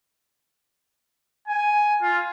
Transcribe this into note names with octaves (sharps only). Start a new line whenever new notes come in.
G#5
F4